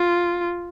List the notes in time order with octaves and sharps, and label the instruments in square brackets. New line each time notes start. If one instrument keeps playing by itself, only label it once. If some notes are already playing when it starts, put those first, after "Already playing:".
Already playing: [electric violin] F4